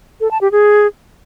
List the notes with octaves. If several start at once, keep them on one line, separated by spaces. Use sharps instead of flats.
A4
A5
G4
G#4